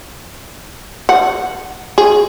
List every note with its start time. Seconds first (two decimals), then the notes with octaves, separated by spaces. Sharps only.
1.09 F#5
1.98 G#4